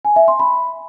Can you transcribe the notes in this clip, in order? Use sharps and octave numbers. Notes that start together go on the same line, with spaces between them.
G#5
E5
C6
B5